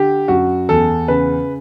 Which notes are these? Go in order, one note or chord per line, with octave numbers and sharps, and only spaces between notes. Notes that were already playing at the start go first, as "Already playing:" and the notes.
Already playing: D3 G4
F#2 F#4
E2 A4
C#3 B4